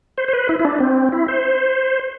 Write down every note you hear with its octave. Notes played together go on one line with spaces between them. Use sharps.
C5
C5
B4
E4
E4
D4
C4
E4
C5